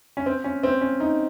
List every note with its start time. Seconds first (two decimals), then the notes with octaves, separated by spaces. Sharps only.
0.17 C#4
0.26 C4
0.44 C#4
0.63 C4
0.81 C#4
1.00 D#4